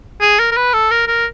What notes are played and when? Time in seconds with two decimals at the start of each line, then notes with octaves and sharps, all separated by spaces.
0.21 G#4
0.39 A#4
0.51 A#4
0.57 B4
0.73 A4
0.91 A#4
1.08 A#4